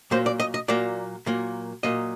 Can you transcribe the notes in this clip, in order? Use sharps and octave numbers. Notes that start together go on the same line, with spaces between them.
A#2 F#3 A#3 C5
D5
D#5
D#5
A#2 F#3 A#3 D5
A#2 F#3 A#3
A#2 F#3 A#3 D#5